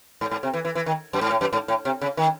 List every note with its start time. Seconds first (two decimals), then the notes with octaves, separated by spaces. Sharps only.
0.21 G#2
0.31 G#2
0.43 C3
0.54 E3
0.65 E3
0.75 E3
0.86 D#3
1.13 F#2
1.21 G#2
1.30 A2
1.41 F#2
1.53 G#2
1.68 A2
1.85 C3
2.02 C#3
2.17 D#3